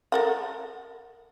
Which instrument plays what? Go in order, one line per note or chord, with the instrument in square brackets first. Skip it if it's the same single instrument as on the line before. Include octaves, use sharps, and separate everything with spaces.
[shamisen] A4 A#4 F#5